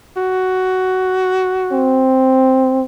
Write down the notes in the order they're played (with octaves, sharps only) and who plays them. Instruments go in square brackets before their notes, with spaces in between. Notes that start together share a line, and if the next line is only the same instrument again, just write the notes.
[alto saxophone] F#4
[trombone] C4